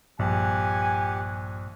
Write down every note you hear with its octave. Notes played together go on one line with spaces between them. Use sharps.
A#1 G2 G4 F#5 G#5